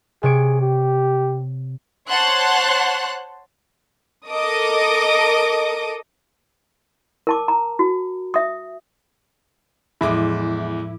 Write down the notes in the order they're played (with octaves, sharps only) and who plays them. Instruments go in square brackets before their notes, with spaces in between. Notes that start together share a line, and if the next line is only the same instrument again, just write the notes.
[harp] C3 C#5 D7 [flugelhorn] G#4
[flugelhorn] G4
[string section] C5 C#5 F#5 A5 C6 F#6
[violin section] A4 A#4 D#5 D6 D#6
[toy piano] A#4 A5 D6
A#5
F#4
E5 D#6
[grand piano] E2 G#3 D6 [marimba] A2 F3 [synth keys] E4